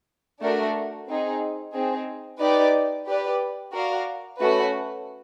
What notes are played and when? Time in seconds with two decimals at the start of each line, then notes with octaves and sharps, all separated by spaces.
0.41 A3 D4 F#4 A#4
1.07 C4 D#4 G#4
1.74 C4 D#4 G#4
2.40 D#4 G4 B4 D5
3.06 G4 B4 D5
3.72 F#4 A#4 D5 F5
4.39 A3 C#4 F#4 B4